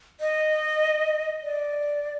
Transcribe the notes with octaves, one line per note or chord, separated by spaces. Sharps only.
D#5
D5